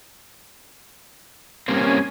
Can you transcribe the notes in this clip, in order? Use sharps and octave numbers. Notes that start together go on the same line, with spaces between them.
G3 A#3 C4 C#4 G#5